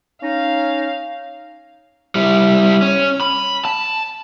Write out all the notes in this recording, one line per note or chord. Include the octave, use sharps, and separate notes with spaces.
C#4 D#4 F5
G3 E4
C#4
B5
A5